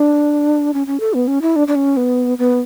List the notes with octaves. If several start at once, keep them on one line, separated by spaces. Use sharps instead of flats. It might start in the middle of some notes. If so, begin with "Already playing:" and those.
Already playing: D4
C#4
C#4
A4
B3
C#4
E4
D4
D4
C#4
B3
B3